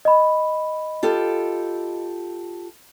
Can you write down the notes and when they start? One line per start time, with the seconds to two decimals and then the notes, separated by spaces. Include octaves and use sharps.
0.05 D#5 B5
1.03 F4 G4 A4